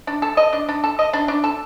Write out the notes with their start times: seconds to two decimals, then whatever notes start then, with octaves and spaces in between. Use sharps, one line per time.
0.07 D4
0.22 A4
0.37 D#5
0.53 D4
0.68 D4
0.84 A4
0.99 D#5
1.13 D4
1.28 D4
1.44 A4